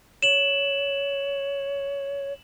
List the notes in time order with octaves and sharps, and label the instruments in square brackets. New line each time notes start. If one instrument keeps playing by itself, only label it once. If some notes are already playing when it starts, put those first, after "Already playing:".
[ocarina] C#5 [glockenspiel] E7 F#7